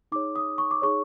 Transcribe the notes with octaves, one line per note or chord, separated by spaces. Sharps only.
D#4 G#4 C#5 D6
D#6
C#6
D6
D#4 G#4 C#5 C#6